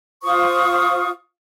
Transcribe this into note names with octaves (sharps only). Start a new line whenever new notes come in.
F4 C5 C#6 D#6